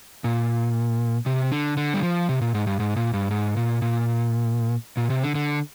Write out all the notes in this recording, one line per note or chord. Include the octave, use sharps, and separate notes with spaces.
A#2
C3
D3
D3
G3
F3
C3
A#2
G#2
G2
G#2
A#2
G2
G#2
A#2
A#2
A#2
C3
D3
D3